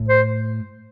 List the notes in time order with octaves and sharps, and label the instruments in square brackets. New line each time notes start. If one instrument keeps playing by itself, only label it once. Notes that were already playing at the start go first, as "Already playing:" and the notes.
Already playing: [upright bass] A2
[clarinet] C5